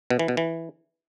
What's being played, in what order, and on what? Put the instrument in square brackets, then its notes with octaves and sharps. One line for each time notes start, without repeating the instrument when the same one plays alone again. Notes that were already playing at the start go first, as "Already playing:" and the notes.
[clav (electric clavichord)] B2
E3
B2
E3